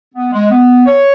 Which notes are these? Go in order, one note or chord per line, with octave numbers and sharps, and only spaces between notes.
B3
G#3
B3
C#5